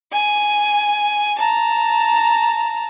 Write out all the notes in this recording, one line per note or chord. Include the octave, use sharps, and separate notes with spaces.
G#5
A5 A#5